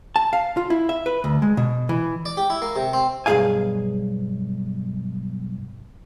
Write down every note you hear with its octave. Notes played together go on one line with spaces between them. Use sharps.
A5
F5
F4
E4
E5
B4
D2
G#3
B2
E3
D5
G4
E4
A#3
C3
C4
B1 G2 B2 G#4 F5 G#5